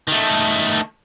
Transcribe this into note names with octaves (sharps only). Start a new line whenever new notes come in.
D#3 A3